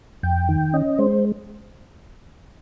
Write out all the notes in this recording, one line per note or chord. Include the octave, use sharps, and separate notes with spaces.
F2 G5
D#3
C#4 D#5
G#3 C5